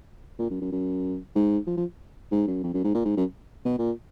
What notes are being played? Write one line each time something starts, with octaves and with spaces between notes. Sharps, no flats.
A#2
F#2
F#2
F#2
G#2
F3
F3
G#2
F#2
F2
F#2
G#2
A#2
G#2
F#2
B2
A#2